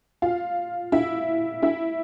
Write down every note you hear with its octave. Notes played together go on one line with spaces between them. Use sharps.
F4 F5
E4 E5
E4 E5